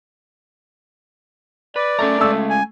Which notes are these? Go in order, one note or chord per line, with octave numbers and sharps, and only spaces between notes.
B4 D5
A3 C#4 A#4 A#5
G#3 A3 C#4 E6
G#5